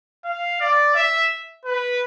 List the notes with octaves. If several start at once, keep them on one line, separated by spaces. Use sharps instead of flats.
F5
D5
E5
B4